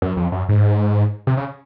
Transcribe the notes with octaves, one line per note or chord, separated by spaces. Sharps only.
F#2
F2
F#2
G#2
C3
C#3